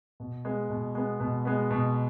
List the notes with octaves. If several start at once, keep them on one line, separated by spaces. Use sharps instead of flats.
B2
G#3 B3
B2
G#3 B3
B2
G#3 B3
B2